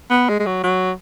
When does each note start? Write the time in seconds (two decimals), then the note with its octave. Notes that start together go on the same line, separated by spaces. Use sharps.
0.10 B3
0.29 G#3
0.40 G#3
0.46 F#3
0.64 F#3